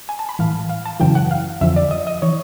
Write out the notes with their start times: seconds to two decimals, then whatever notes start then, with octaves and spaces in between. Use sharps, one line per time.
0.09 G#5
0.19 A5
0.29 B5
0.39 A2 E3 F5
0.69 F5
0.86 A5
1.00 F#2 C#3 E3 G5
1.15 F#5
1.31 F5
1.61 F2 D3 F3 E5
1.76 D5
1.91 D#5
2.07 D#5
2.22 E3 C#5